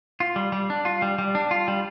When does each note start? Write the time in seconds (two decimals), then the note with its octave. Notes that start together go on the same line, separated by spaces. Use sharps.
0.20 F4
0.36 G3
0.52 G3
0.70 D4
0.85 F4
1.02 G3
1.19 G3
1.35 D4
1.51 F4
1.68 G3